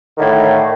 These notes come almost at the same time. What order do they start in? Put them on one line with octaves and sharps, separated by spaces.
D#3 D3 A2